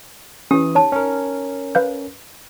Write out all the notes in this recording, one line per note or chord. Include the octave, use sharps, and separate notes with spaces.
E3 C#4 G4 D#6
D#4 C#5 A5
C#4 A#4
B4 F5 G6